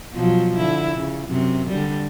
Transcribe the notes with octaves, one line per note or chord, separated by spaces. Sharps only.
B2 F3 F#3
D3 E4
C#3
F#2 C3
D3 G3